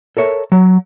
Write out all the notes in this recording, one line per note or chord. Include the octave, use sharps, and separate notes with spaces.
A4 A#4 C#5 E5
F#3